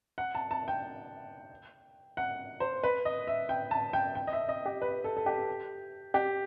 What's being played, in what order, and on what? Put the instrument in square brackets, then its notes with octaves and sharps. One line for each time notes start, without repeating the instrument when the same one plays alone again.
[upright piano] F#5
A5
A5
G5
F#5
C5
B4
D#5
E5
G5
A5
G5
G5
D#5
E5
D#5
G4
B4
A4
A4
G4
G4